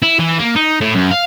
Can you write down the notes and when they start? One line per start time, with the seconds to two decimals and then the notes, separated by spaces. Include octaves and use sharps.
0.02 E4
0.19 E3
0.39 A#3
0.56 D#4
0.81 A2
0.95 F#2
1.11 F5